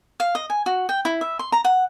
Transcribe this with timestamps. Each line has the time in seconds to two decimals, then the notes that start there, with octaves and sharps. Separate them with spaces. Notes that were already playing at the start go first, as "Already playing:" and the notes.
0.20 F5
0.35 D#5
0.50 G#5
0.66 F#4
0.89 G5
1.05 E4
1.21 E5
1.39 C6
1.52 A#5
1.64 F#5